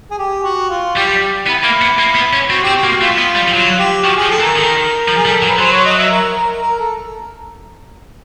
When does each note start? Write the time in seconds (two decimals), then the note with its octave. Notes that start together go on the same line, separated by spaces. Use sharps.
0.11 G#4
0.18 G4
0.44 F#4
0.70 F4
0.96 G3 G4
1.47 B3 E4
1.64 A#3
1.81 B3
1.99 A#3
2.15 B3
2.33 C#4
2.50 C4 F#4
2.63 C4 G4
2.76 F#4
2.84 A#3
2.88 F#4
3.01 A3 F4
3.18 B3
3.36 G3
3.48 F3
3.53 F#3 F4
3.79 G4
4.04 F3 F#4
4.17 F3 G#4
4.30 A4
4.40 E3
4.43 A#4
4.56 D#3
5.08 F3
5.16 G#4
5.25 G3 A4
5.38 F#3 A#4
5.49 B4
5.59 F#3 C5
5.72 C#5
5.85 D#5
5.98 E5
6.11 A#4
6.37 A#4
6.62 A#4
6.79 A4